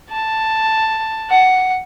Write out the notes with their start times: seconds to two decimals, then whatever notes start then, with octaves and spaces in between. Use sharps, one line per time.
0.10 A5
1.30 F#5